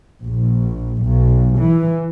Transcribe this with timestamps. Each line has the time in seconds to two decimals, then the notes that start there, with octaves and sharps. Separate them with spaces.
0.25 A#1
1.04 B1
1.58 E3